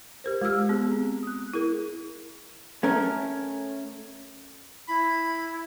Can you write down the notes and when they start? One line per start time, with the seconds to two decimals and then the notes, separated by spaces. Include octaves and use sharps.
0.24 G4 A#4 C5
0.42 G#3 F4 G4 E6 F6
0.69 B3 G#4
0.92 C4
1.23 D#6 F#6
1.53 E4 G#4 A#4
2.83 A3 C#4 A#4
4.88 E4 B5